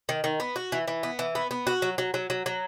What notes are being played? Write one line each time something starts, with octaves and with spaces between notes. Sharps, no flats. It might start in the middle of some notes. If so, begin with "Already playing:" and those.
D#3
D#3
B3
F#4
E3
E3
B3
E3
B3
B3
F#4
F#3
F#3
F#3
F#3
F#3